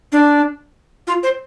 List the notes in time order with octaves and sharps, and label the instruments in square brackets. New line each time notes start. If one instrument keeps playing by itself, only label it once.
[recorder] D4
F4
C5